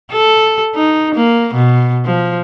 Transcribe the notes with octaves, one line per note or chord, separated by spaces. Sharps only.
A4
D#4
A#3
B2
F3